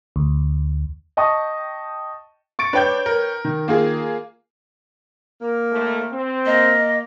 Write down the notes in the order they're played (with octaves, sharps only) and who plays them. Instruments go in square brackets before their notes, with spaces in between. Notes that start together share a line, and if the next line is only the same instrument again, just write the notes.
[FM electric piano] D2
[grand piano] D#5 G5 A5 C#6 D#6
C#6 A6 D7
[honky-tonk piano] D4 G6 [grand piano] B4 C#5 G5
[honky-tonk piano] A#4
[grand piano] D#3
[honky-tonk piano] A#3 F4 G#4
[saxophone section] A#3
[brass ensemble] D#2 A2 A3
C4
[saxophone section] A#3 [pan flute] D#5